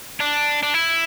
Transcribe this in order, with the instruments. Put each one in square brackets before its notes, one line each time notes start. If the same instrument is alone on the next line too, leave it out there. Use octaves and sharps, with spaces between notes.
[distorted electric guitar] D4
D4
E4